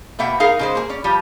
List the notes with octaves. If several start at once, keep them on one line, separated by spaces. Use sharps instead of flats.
B2 A#3 E5 F#5 G5
D#4 G#4 A#4 F5
C#3 G#3 C5
A#3 G#4
C#4 D5
F3 G3